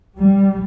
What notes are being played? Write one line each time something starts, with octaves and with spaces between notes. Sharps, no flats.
G3